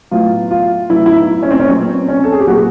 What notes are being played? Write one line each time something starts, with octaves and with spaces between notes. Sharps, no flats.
A2 F#3 B3 F4
F4
A2 F#3 B3 E4
E4
D#4
C#4
C4
C#4
A#2 F#3 B3 C4
C#4
A4
G#4
G4
A#2 F#3 B3 F#4